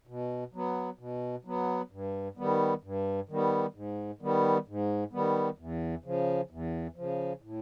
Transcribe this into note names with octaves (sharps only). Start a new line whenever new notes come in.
B2
F#3 B3
B2
F#3 B3
G2
D#3 G3 B3
G2
D#3 G3 B3
G#2
D#3 G3 B3
G#2
D#3 G3 B3
E2
C#3 F3
E2
C#3 F3
A2